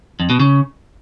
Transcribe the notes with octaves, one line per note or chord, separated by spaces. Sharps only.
F2
B2
C#3